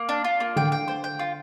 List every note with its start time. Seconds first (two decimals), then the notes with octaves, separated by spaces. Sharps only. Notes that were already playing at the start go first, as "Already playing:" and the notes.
Already playing: A#3
0.09 D4
0.24 F4
0.40 A#3
0.56 D3 G5
0.72 G5
0.88 C5
1.04 G5
1.19 F4